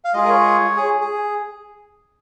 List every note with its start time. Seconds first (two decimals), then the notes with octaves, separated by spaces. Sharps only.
0.05 F5
0.14 G#3 F4 G#4 D#5
0.25 A#4
0.29 C#5
0.77 G#4
1.01 G#4